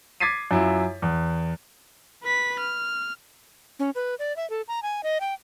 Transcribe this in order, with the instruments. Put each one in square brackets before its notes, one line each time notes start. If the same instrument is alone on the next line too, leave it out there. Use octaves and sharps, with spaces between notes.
[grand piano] D6 G#6 A6 B6 C7 D#7
F#2 E4 F4
E2
[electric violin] B4 B6
F6
[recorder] C#4
B4
D5
E5
A4
A#5
G#5
D#5
G5